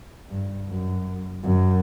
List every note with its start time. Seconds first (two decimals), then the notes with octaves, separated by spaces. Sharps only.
0.29 G2
0.68 F#2
1.44 F#2